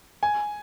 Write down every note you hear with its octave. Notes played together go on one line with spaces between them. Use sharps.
G#5